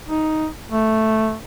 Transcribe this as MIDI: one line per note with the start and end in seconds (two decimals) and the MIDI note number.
0.07 0.48 63
0.70 1.36 57